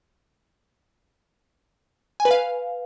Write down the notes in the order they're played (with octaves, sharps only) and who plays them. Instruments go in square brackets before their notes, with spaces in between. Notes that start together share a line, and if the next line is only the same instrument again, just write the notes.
[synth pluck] G#5
B4
F5